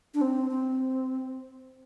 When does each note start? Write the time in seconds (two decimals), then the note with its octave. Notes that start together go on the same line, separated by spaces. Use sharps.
0.14 D4
0.21 C4
0.51 C4